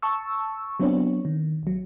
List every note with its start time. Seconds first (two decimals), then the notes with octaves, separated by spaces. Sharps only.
0.02 A5 C#6 E6
0.80 F#3 B3 C4 D4 C#5
1.25 D#3
1.63 A1 F#3